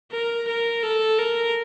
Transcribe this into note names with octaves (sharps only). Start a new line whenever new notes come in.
A#4
A#4
A4
A#4